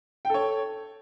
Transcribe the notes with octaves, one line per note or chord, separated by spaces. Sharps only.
A4 C#5 G5